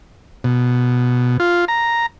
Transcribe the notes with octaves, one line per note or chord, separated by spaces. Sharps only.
B2
F4
A#5